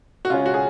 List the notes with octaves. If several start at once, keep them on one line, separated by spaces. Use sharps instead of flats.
F#4
C#3 G#3 C#4 F4
F#4
G#4